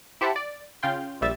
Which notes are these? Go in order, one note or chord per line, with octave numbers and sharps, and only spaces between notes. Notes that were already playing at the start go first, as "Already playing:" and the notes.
E4 G4 C5 E5 F#5 A5
D5
C#3 F4 G5 C6
A#1 G3 E5 A6